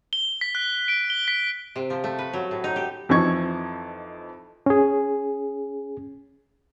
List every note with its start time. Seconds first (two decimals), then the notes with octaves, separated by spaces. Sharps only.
0.13 G7
0.41 B6
0.55 F#6
0.88 D7
1.10 G7
1.28 B6
1.76 C3
1.90 F3
2.04 A3
2.19 B4
2.33 F#3
2.51 A2
2.64 D#4
2.76 G4
3.09 F2 E3 F3 D#4 C#6 G#6
4.66 C#4 G#4